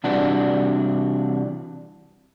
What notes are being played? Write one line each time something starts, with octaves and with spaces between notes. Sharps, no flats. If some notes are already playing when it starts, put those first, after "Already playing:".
C3 E3 G3 D4 F#4